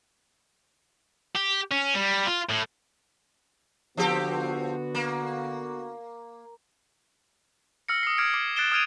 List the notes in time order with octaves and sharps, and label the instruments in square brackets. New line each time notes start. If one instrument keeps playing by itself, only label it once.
[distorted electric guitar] G4
C#4
G3
F4
A2
[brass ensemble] D3 B3 F#4 [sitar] F3 C4 G4
[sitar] A#3
[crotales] E6 F6 A#6 C#7
D#6 C7
D6 F6 G#6 C7 D7
D6 C7
F#6 A6 C7 D7 E7 G7
D#6 F6 G#6 D7 D#7 F7